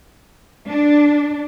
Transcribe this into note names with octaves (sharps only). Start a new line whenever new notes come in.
D4